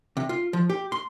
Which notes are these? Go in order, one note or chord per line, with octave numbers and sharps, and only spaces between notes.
C3
F4
F3
G4
C6